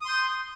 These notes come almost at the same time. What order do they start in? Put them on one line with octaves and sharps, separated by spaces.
D#6 C6 G6